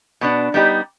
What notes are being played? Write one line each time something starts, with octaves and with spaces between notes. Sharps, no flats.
B2 B3 D4
G3 B3 D#4 G4